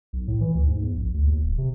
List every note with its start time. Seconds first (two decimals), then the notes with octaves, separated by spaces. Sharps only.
0.13 B1
0.28 A2
0.41 E3
0.55 D2
0.67 G#2
0.82 E2
0.97 A#1
1.14 D2
1.27 D#2
1.43 D1
1.58 C3